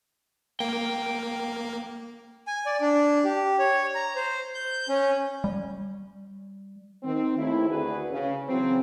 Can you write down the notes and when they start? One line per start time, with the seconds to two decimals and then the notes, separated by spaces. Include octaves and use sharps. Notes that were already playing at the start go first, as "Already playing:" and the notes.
0.60 A#3 G5
2.47 G#5
2.66 D5
2.81 D4
3.24 G4
3.59 C#5
3.95 A#5
4.16 C5
4.54 G6
4.89 C#4
5.44 G3
7.03 D#3 C4
7.37 D#2 A3 C4 E4
7.69 D2 F#4 G#4 B4
8.10 C#3
8.48 C#3 E3 F#3 C4